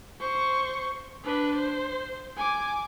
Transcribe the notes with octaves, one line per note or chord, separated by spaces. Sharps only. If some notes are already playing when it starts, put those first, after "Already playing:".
C5 C#6
D4 B4
C5
G#5 D6